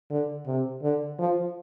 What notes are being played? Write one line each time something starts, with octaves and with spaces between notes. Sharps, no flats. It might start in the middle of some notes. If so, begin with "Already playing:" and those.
D3
C3
D3
F3